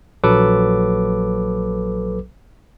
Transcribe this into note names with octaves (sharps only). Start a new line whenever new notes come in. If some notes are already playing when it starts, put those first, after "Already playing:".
A#1 F#3 A4 B4 D6